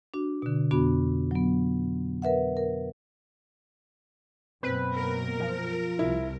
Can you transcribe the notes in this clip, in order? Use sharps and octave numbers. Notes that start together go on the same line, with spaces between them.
D4 F#4
B2 D3
F2 B3 D4 F#4 B5
F#3 B3
A#4 B4 E5 F#5
A#4
F#2 B2 A#3 C4 B4
A#4
F3
C2 E4